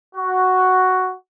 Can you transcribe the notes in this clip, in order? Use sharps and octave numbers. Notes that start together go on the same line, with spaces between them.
F#4